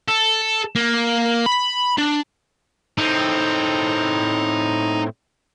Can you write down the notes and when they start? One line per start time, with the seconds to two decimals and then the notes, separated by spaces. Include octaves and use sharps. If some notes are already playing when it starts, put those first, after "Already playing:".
0.08 A4
0.75 A#3
1.46 B5
1.98 D4
2.98 A2 C4 D#4